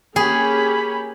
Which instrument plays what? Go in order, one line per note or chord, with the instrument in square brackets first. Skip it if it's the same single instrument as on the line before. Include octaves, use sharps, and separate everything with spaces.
[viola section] A#3 C#4 G4 [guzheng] G#4 [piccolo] B5